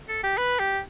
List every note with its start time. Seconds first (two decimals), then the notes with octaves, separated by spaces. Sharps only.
0.08 A4
0.23 G4
0.37 B4
0.59 G4